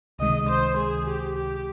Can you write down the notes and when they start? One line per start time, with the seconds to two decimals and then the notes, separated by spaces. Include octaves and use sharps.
0.19 C#2 C3 D#3 G#3 D#5
0.49 C5
0.77 G#4
1.07 G4
1.36 G4